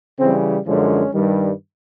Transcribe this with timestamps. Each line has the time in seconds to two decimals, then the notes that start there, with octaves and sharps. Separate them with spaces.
0.19 C#3 E3 G3 C4
0.66 F#2 D3 F3 G#3 C#4
1.14 G2 D#3 G3